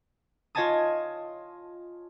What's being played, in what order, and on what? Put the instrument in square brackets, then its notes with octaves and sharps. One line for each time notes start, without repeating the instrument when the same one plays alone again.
[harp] F4 C#5 D#5 G#5 A5 D#6